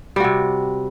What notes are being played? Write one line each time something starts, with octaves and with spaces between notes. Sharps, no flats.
C3 G3 F#4